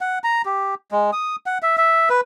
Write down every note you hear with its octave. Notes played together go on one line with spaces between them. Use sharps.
F#5
A#5
G4
G#3
D#6
F#5
E5
E5
B4